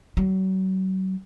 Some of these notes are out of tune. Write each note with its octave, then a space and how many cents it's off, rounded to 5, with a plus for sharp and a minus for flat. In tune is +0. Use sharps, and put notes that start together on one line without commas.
F#3 +35